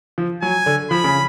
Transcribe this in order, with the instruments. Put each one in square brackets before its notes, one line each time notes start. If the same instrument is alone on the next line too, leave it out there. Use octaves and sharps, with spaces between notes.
[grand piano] F3
[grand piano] F#3 [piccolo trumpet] G#5
[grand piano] D3
[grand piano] F3 [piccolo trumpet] B5
[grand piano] C#3